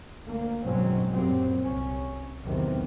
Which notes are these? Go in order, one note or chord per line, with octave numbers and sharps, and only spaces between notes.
D2 A#3
G#1 F#2 B2 F#3 C4 C#4
F#2 A#2 F#3 G3 C4
C2 C#4
B1 E2 C3 D#3 C4